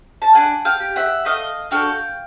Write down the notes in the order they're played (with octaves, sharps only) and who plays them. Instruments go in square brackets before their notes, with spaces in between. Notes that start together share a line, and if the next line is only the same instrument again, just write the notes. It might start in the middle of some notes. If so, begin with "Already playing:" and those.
[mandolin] A5
D4 F#5 G#5
F5 G5
G4
E5 F#5
A3 D#5 F5
D4 F#4 A4 F5 G5